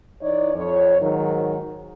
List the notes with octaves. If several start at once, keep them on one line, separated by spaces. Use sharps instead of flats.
E3 D#4 C#5 D5
F2 C#5
G#2 D#3 F#3